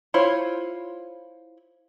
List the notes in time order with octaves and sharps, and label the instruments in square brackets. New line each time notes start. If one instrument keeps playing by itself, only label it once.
[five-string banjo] E4 F4 C5 C#5